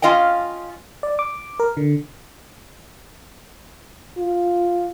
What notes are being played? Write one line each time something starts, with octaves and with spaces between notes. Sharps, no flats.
C#4 F4 D#5 F5 G5
D5
D6
A#4
D3
F4